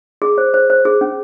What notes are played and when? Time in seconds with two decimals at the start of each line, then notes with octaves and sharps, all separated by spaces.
0.22 G#4
0.38 C5
0.54 C5
0.70 C5
0.85 G#4
1.01 C#4